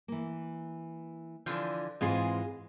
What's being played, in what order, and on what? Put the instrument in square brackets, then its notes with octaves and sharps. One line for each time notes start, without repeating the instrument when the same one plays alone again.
[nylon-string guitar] E3 A#3
[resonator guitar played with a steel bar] D3 E3 F3
[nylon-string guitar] G#2 E3 C4 [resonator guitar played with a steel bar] G#3 F4 G#4